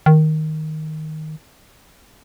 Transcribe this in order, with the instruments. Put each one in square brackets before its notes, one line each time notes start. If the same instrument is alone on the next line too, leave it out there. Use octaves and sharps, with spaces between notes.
[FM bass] D#3